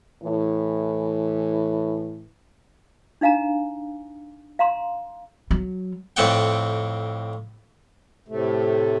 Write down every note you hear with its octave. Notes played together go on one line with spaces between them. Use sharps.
A2 E3
D4 D#4 F5 G#5 A#5
F5 A#5 C6
F#3
F2 A2 C4 D5 F#5 G5
A2 C3 A3